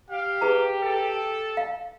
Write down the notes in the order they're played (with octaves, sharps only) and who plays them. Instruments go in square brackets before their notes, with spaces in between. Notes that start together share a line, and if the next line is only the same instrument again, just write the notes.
[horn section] G4 [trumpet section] F5
[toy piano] G#4 B4 A#5
[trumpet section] A4
[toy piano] F5